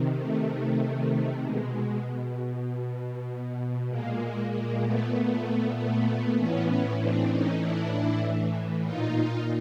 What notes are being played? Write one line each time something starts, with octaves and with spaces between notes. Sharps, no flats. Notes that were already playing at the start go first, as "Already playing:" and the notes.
Already playing: C3 D#3
A3
A3
B2 G#3
A#2 G#3 A#3
G#3 A#3
A3 B3
A3 B3
A3 B3
A2 E3 B3 C#4
C4 D4
C#4 D#4
D4 E4
A#2 D#4 F4